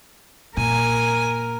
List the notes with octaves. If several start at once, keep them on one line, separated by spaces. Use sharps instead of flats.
A#2 A#4 G#5